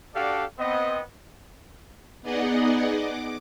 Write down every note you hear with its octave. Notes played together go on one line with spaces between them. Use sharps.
D4 F#4 G4 A4 D5 F5
B3 C4 D#5
B3 D#4 G#4 D5 D#5 F#5
D6